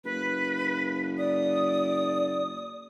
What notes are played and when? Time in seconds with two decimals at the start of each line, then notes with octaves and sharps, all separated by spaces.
0.04 F#1 B4
1.18 D5 D#6